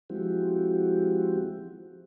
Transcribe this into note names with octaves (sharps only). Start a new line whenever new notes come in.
F3 G#3 C4 E4 F#4 G4